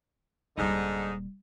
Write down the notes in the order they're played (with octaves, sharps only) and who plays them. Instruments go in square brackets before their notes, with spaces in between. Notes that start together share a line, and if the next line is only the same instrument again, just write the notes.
[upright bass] D#1 G3 [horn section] G#2 D3 D#4